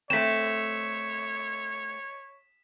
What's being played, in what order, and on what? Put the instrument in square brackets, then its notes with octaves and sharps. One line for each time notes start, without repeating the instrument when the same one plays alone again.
[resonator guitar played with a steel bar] A3 C4 [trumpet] C#5 [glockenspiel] B6 E7